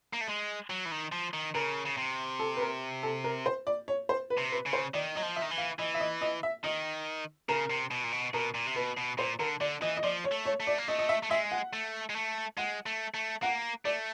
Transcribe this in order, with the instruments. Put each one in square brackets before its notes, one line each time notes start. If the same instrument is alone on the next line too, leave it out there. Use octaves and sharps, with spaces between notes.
[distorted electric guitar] A#3
A3
G#3
F#3
E3
D#3
F3
D#3
[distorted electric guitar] C#3 [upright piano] A#4
[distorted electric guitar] C#3
C3
[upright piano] A4
B4
A#4
A4
A#4
C5
D5
C#5
C5
B4
[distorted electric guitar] C3
[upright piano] B4
[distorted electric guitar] C#3
[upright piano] C5
[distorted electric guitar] D#3 [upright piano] D5
[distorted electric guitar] F#3 [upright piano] D#5
[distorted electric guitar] F3
[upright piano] E5
[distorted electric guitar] D#3
E3
[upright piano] F5
[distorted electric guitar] E3 [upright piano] D#5
[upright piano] E5
D#5
D#5
E5
[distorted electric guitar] D#3 [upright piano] D#5
[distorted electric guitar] C#3 [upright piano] A#4
[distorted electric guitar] C3
B2
A#2
B2
[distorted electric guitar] B2 [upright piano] A#4
[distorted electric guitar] A#2
C3
[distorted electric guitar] B2 [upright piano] B4
[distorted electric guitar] B2
[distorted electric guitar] A#2 [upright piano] C5
[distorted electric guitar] D3 [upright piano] A#4
[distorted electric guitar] D3 [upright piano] D5
[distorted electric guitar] E3 [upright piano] D#5
[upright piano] D#5
[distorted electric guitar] F3 [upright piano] D5
[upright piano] C#5
[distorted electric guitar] A3
[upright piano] C#5
[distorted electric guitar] A3
[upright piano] D5
[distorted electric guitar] A#3
[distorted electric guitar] A3 [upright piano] D#5
[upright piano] D#5
E5
[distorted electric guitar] A3
[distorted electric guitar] G#3 [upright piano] E5
[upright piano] F#5
[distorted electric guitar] A3
G#3
A3
[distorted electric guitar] G#3 [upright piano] F#5
[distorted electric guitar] A3
A3
[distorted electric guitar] A#3 [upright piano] F#5
[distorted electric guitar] A3 [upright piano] D5